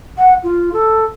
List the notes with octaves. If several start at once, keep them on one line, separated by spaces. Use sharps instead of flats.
F#5
F4
A4